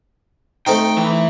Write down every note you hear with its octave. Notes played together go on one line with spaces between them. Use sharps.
A3 C4 D#4 G5
E3